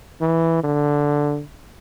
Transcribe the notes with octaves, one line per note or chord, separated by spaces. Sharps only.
E3
D3